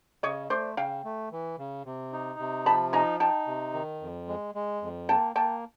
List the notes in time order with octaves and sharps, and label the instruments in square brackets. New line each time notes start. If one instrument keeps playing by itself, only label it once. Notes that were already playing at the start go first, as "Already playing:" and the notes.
[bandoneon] C#3 [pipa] C#5 D#5
[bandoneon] A3 [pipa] C5 D5
[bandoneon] C#3 [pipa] F5 G5
[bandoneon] A3
E3
C#3
C3
D#4
C3
[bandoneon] F3 [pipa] A5 B5
[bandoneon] D#4 [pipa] G#5 A#5
[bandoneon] D#4 [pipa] G5 A5
[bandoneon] C3
D#3
F2
G#3
G#3
F2
[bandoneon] A#3 [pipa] G5 A5
[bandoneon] A#3 [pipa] G5 A5